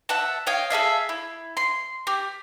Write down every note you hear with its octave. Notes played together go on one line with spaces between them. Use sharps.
E5 F#5 A5
C#5 D#5 F5 G5
G#4 A4 E5 F5
E4
C6
G4